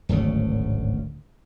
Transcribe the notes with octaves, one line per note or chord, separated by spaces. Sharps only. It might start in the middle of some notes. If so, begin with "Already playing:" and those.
D1 G#1 D2 C#3